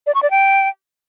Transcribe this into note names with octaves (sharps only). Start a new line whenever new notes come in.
D5
C#6
D5
G5